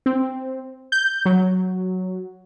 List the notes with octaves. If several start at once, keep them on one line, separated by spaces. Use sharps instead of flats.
C4
G6
F#3